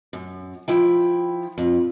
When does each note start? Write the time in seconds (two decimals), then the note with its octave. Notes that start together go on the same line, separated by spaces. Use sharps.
0.13 F#2
0.68 F3 E4 G5
1.58 F2